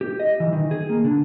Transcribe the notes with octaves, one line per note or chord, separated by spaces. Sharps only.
G4
D#5
E3
D#3
G#4
A#3
D3